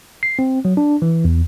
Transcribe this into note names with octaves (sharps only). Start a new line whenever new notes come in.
C7
C4
F#3
D4
E3
E2